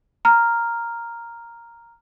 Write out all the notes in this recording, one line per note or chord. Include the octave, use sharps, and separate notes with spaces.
A#5 F6